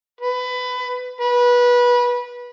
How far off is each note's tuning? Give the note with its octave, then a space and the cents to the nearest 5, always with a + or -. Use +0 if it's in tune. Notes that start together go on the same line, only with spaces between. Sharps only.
B4 +20
B4 -20